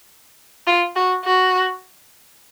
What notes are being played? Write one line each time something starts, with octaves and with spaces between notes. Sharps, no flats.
F4
F#4
F#4